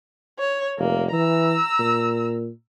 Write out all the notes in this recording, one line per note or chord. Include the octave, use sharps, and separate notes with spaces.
C#5
F1 A#3
E3 A#5 E6
A#2